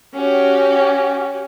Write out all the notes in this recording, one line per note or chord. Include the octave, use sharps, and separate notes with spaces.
C#4 F#4 G4